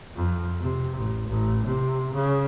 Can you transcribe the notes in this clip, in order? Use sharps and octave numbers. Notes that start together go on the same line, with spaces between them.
F2
C3
A1
A1
C3
C#3